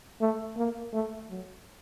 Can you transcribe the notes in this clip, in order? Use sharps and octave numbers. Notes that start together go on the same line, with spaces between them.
A3
A#3
A3
F#3